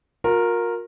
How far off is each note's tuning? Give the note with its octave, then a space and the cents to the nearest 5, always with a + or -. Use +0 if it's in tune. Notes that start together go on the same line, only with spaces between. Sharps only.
F4 +45 A#4 +0